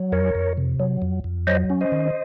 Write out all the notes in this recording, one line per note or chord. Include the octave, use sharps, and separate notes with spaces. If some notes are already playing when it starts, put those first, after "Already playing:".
Already playing: F#3
F2 A#4 C#5
F2
C3
F#3
F2
F2
F#3 C5 D#5
C#4
C5 D#5
D#3